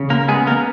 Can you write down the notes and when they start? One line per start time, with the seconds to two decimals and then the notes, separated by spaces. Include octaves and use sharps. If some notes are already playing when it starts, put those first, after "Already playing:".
Already playing: C#3
0.10 A#3 A#4
0.28 G#3 B3 G#4
0.47 A#3 A#4